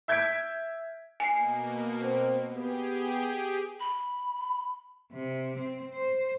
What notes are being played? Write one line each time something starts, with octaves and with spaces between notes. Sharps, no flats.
E5 G6 G#6 B6 D7
B2 A#3 G#5 C7
C4
B3 G4 G#4 G5
B5
C3
C4
C5